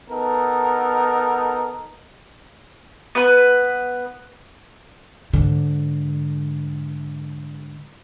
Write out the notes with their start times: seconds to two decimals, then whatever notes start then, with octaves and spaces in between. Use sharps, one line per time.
0.10 B3 D#4 A4 A#4
3.15 B3 B4
5.33 G#2 D3